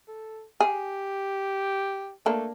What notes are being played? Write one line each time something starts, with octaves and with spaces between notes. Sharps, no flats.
A4
G4 G#4
A3 A#3 D4